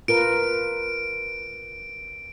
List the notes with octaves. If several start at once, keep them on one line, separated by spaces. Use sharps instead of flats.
F4 A#4 B4 D7